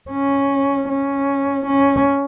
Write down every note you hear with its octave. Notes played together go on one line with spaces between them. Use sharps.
C#4
C#4
C#4